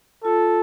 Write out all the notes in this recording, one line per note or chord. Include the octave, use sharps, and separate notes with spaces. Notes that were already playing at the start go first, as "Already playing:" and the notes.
F4 A4